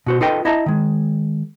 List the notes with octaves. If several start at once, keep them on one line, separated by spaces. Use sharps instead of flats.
B2 F#4 C5
D#4 F4 A4 B4 D#5 G5
E4 D#5 E5 A5 A#5
D#3 G#3